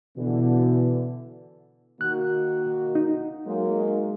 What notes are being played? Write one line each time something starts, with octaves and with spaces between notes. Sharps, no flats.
B2 D3 E3
D#3 A#3 F#4 F#6
D#4
F#3 G#3 A#3